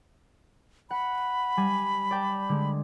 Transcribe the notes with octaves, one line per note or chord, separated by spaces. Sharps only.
F#5 B5
G3 G#5
D5 G5 A5
D3 G#3